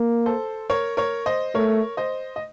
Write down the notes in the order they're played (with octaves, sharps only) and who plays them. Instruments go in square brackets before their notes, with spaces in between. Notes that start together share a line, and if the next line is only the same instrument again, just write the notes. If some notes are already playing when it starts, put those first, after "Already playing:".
Already playing: [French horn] A#3
[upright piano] A4 C5
A#4 C#5
A#4 C#5
C5 D#5
[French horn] A3 [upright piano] A#4 C#5
[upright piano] C5 D#5
D#5